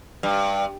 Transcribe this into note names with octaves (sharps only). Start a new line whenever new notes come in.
G2